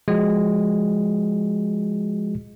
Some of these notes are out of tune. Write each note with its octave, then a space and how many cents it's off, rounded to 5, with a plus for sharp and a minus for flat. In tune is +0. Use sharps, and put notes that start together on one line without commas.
F3 -5 G#3 +0 F#4 +0